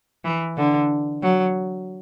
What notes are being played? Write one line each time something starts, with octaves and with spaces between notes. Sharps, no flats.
E3
D3
F#3